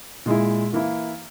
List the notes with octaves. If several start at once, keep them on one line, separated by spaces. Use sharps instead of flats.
A#2 G#3 E4
E3 A#3 E4